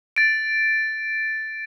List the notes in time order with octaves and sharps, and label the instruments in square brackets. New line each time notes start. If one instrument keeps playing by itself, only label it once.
[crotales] A6 D7